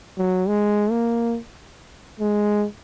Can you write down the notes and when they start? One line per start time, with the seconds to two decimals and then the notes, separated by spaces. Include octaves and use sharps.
0.18 F#3
0.48 G#3
0.91 A#3
2.20 G#3